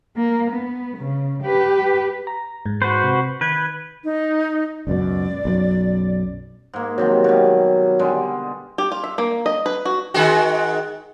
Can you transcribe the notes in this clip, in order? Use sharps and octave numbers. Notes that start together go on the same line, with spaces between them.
A#3
B3
C#3
G4 B4
A#5
G#2
F#4 B4 C5
C3
D#3 B4 G6 G#6
D#4
C#2 F#2 B2 D5
B1 F#2
G#2 A#3
C3 D#3 F3 F#3
B2 G3
D3 G3 G#3
G4
F4
E5
A#3
D#5
B4
F#4
D#3 G#3 F#4